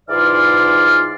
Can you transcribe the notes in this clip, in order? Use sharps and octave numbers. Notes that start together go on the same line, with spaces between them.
G#2 E3 F4 D5 F6